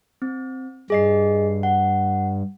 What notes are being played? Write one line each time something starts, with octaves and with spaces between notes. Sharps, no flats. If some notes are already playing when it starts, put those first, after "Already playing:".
C4
G2 G#4 D#5 C7
F#5